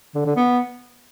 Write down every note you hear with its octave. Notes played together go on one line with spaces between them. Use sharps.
D3
D3
B3